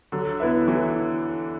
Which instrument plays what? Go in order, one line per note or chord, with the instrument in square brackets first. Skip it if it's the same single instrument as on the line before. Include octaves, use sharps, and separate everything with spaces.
[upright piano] D3 [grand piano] F#3
[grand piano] B3 E4 B4 E5
[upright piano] E3 [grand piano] F#3